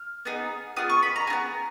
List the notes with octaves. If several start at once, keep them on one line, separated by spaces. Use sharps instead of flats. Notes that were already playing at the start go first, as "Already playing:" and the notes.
Already playing: F6
B3 D#4 G#4
B3 F4 G#4 D#6
C#6
B5
A#5
F4 G#4
B3